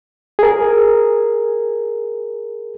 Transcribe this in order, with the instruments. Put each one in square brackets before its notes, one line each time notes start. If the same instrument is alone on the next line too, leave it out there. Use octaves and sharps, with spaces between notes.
[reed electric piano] G#4 A#4